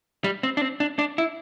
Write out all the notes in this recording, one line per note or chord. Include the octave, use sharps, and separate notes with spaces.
G3
C4
D4
C4
D4
D4
E4